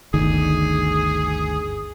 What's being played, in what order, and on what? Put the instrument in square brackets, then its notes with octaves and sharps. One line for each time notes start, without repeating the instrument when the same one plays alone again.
[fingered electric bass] G1 D2 D#3 [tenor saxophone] G#4